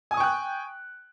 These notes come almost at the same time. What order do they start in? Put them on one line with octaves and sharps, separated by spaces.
G#5 D#6 C#6 G5 F#6